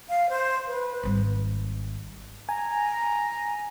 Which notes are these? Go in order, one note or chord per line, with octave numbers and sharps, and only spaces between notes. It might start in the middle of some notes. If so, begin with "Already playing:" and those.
F5
C5
B4
G#1 G3
G#5 A#5